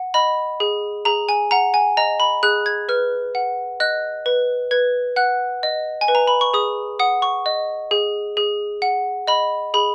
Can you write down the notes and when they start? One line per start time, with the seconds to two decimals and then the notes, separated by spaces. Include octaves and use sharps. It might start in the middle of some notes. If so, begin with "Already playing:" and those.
Already playing: F#5
0.14 D#5 B5
0.60 G#4
1.05 G#4 A#5
1.29 G#5
1.51 F#5 A#5
1.74 G#5
1.97 D#5 A#5
2.20 B5
2.43 G#4 F#6
2.66 G#6
2.89 B4 F6
3.35 F#5
3.80 D#5 F#6
4.26 B4
4.71 B4 G#6
5.16 F#5 F#6
5.63 D#5
6.01 G#5
6.08 B4
6.15 A#5
6.27 B5
6.41 C#6
6.54 G#4 D#6
6.99 F#5 D#6
7.22 C#6
7.46 D#5
7.91 G#4
8.37 G#4
8.82 F#5
9.28 D#5 B5
9.74 G#4 B5